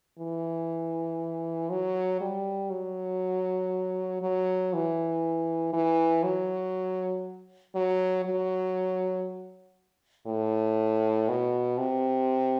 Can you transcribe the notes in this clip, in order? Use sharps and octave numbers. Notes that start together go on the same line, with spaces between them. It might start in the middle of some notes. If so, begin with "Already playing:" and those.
E3
F#3
G3
F#3
F#3
E3
E3
F#3
F#3
F#3
A2
B2
C3